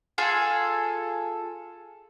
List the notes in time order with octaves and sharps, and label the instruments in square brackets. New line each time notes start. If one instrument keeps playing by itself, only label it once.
[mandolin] F4 G#4 A4